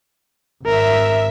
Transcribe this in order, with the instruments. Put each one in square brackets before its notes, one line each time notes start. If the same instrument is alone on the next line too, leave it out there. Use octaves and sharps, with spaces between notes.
[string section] G#1 E5 [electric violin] A#4